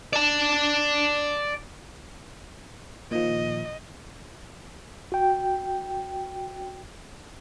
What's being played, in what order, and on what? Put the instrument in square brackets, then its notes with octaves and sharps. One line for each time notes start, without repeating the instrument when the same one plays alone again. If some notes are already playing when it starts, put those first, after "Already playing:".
[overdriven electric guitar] D5 A5
[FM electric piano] A#2 D#3 F3 [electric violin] D#5
[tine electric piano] F#4 G5